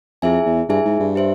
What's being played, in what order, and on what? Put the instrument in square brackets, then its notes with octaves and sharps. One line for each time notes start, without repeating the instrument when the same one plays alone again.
[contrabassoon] F2 [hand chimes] E4 G#4 E5 G#5
[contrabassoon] E2
[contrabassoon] G2 [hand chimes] E4 G#4 E5 G#5
[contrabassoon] G#2
G2
[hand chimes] G4 C5 E5